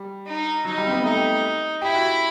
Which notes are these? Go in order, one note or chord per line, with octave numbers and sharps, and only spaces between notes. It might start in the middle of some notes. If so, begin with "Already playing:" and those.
Already playing: G3
D#4
F#3 D#4
G3
C4
B3
A3 D#4
G4
E4 G4
F#4